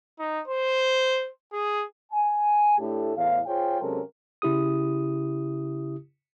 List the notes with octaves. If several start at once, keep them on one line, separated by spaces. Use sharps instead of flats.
D#4
C5
G#4
G#5
A2 A3 D4 E4 G4 A4
E2 A2 F5
F4 G#4 C5 C#5 G5
C3 F#3 G#3 C#4 A4 A#4
C#3 E4 G4 D#6